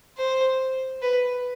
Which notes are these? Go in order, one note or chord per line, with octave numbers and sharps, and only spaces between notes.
C5
B4